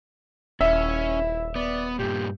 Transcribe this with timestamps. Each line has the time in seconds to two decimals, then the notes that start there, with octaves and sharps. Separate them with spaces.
0.61 D#1 C#4 E4 E5
1.56 B3 D5
1.99 G2 A#2 G4